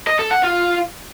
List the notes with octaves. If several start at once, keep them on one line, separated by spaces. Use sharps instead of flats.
D#5
A4
F#5
F4